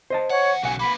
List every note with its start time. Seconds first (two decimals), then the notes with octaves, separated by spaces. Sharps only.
0.10 C5 D#5 A5
0.30 D2 C#5 F#5
0.63 B1 C#3 F#4 F#5 G#5
0.79 A#3 B4 B5